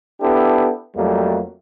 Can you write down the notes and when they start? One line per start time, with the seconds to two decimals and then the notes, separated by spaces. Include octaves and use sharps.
0.21 B3 D4 E4 G4 A4
0.96 F2 F#3 G3 A3 A#3